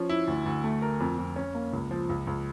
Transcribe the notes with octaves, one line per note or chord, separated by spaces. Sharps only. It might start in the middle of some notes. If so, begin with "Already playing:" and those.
Already playing: F3 C#4
E4
D2
D2
A3
A#4
F2
F2
C#4
A#3
C#2
F3
C#2
C#2